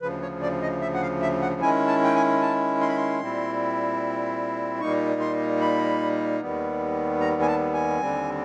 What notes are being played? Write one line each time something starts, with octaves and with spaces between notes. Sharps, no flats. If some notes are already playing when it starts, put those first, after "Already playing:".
D2 C#3 F3 B4
C#5
D5
D#5
E5
F#5
F5
E5
F#5
D#3 G#3 C#4 E4 G#5
A5
G5
G#5
A5
C6
B5
C6
A#2 G3 C4 E4
A#2 G3 A#3 D#4 C#6
C6
B5
D#2 D#3 G3 B3
A#5
G#5
A5
G#5
D#2 D3 G3 C4